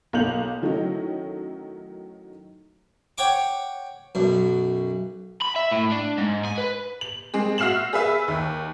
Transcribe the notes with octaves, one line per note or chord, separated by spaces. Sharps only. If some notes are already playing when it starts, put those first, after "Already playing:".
B1 A#3 F5 G6 F7 F#7
D#3 F#3 A3 C#4 D#4 E4
C#5 F#5 G5 C#6 D6
B1 F#2
B5
E5
A2
D4
G#2
G#5
B4
F#7
G#3 C4 G#4
F#4 E5 F6 C7 E7 F#7
G#4 B4 E5
D#2